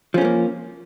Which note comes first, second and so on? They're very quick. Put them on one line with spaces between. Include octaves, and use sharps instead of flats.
F3 C#4 A3 A#3